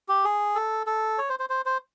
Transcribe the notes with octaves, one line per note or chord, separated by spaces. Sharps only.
G4
G#4
A4
A4
C#5
C5
C5
C5
C5